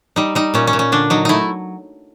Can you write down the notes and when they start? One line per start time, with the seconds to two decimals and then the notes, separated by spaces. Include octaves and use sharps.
0.16 G3 D#4
0.35 G3 D#4
0.54 A#2 C#4
0.67 C#4
0.73 A#2
0.79 C#4
0.92 D3 D4
1.10 F#3 D#4
1.25 A3 D#4 E4